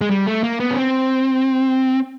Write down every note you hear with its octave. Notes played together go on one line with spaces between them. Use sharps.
G#3
G3
A3
A#3
B3
C#4
C4